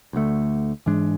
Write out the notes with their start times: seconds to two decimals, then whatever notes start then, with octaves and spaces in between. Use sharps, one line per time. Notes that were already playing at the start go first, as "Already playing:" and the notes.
0.13 D2 D3 A3
0.86 G#2 E3 G#3 D4